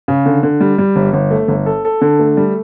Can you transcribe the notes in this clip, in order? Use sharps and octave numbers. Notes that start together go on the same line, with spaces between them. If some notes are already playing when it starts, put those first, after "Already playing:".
C#3
D3
D3
G3
G3
G1
G1
A3
G1
A4
A4
D3
A3
G3